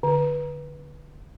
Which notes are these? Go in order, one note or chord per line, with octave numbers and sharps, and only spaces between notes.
D3